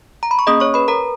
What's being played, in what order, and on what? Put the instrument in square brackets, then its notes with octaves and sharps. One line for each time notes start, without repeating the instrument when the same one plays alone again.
[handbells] A#5
B5
C#6
A#3 C#4 G#4 D#5 D#6
C#5 C#6
B4 B5
A#4 A#5